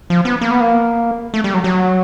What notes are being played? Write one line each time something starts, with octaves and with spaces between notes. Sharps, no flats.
F3
B3
A#3
B3
A#3
A3
G3
F#3
F#3